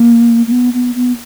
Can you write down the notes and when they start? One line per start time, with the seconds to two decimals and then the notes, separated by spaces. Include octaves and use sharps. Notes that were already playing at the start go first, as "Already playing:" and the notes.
Already playing: A#3
0.47 A#3
0.51 B3
0.73 B3
0.95 B3